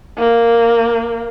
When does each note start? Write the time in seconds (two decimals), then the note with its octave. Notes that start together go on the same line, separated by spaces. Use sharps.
0.18 A#3